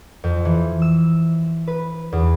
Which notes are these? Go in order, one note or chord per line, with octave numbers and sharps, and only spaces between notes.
F2
E3
E6
B4
E2